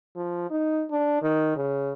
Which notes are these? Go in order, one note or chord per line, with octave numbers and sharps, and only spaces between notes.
F3
D#4
D4
D#3
C#3